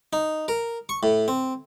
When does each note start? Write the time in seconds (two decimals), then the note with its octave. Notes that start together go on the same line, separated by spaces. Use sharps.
0.13 D#4
0.48 A#4
0.89 C#6
1.03 A2
1.28 C4